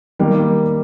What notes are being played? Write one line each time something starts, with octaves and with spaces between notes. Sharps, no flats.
D#3 G3 A#3